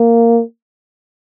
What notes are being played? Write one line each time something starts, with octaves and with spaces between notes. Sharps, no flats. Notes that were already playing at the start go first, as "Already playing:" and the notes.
Already playing: A#3